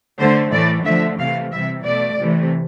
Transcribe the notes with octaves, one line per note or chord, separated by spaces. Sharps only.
D3 A3 C5
A2 E3 A3 D5
D3 F3 A3 E5
C3 E3 A3 F5
C3 E3 G3 E5
B2 A3 D5
C3 E3 A3